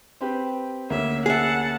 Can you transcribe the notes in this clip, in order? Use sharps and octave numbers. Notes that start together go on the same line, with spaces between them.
C4 G4 B4
D2 A#3 C#4 E5
G#4 E5 F#5 A5